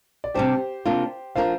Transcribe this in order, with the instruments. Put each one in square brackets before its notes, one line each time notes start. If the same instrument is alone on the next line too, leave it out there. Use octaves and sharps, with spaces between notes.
[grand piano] D5
[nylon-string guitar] C3 G3 D4 [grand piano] G4 C5
[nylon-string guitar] C3 A#3 D4 F4
[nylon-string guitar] F3 D4 F4 A#4 [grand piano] C5 F5